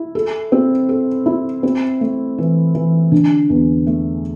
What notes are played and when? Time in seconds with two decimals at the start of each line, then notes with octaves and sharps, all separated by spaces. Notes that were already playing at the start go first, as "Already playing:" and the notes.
Already playing: E4
0.15 A4
0.52 C4
0.89 A4
1.26 E4
1.63 C4
2.01 A3
2.38 E3
2.75 E3
3.12 D3
3.50 E2
3.87 A3